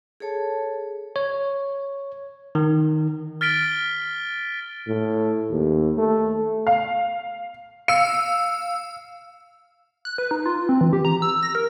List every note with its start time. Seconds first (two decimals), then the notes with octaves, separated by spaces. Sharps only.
0.20 G#4 A4 C#5 A5
1.16 C#5
2.55 D#3
3.41 F6 A6 B6 D7 G7
4.88 A2
5.50 D#2
5.98 A3
6.67 F5
7.88 F5 E6 C#7
10.05 F#6
10.18 B4
10.31 D#4
10.46 F4
10.69 C4
10.81 E3
10.93 G4
11.05 A#5
11.22 E6
11.43 A#6
11.55 A#4